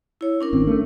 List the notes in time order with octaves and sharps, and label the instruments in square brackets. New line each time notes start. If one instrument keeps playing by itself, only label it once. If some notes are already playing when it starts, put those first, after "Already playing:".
[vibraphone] E4 C#5
C#4 D4 A#4
[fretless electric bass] G#1 C4
A3